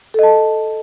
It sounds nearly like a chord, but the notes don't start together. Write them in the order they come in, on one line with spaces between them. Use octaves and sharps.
A4 D#5 A5